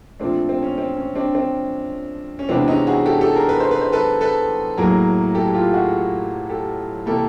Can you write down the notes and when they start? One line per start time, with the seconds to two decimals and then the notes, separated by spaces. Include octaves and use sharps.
0.20 A#2 F3 A3 C4 D4
0.49 C4
0.63 C#4
0.78 C4
0.97 C#4
1.15 C4 D4
1.34 C4 D4
2.39 C#4
2.49 C3 E3 G#3 B3 C4 D4
2.68 C#4 D#4
2.87 F#4 G#4
3.06 G4 A4
3.21 G4 A4
3.34 G#4 A#4
3.49 B4
3.60 C5
3.71 B4
3.81 C5
3.92 A4 B4
4.21 A4 B4
4.77 A2 F#3 A#3 G#4 A#4
5.34 G4 A4
5.54 F4 G4
5.73 F#4 G#4
6.49 G4 A4
7.06 C3 E3 G3 A#3 G4 A4